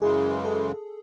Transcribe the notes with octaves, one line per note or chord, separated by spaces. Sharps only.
F#2 C#3 E3 G#3 G#4
A4